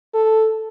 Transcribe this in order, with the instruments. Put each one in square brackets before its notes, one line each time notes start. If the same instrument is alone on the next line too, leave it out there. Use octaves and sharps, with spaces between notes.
[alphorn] A4